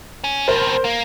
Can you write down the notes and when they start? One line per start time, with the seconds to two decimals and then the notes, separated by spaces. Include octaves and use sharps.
0.24 C#4
0.48 F2 B2 A#4 C5
0.85 A#3